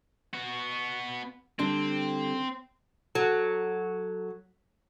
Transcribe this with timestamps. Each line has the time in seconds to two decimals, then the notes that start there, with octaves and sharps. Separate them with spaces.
0.33 B3 F#4
1.59 D3 G3 C4 D4
3.15 F#3 A4